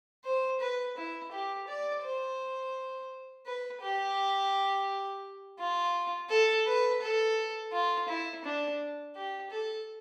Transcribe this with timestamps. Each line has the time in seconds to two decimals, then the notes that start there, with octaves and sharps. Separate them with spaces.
0.25 C5
0.60 B4
0.97 E4
1.31 G4
1.67 D5
2.03 C5
3.46 B4
3.81 G4
5.59 F4
6.30 A4
6.66 B4
7.02 A4
7.72 F4
8.08 E4
8.44 D4
9.15 G4
9.51 A4